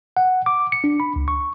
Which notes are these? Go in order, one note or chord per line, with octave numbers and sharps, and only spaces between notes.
F#5
D6
C#7
D4
B5
C#2
C#6